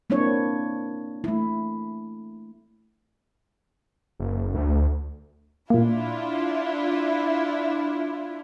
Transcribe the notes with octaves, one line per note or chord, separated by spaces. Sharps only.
A#3 C4 D4 E4 C#5
A3 E4
F#1
D2
A#2 A#3 D4 E4 F4